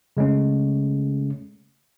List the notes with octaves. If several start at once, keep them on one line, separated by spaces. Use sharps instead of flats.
C#3 G#3 A3 C#4